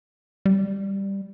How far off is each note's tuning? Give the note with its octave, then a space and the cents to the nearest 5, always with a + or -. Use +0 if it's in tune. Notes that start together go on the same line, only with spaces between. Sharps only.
G3 +5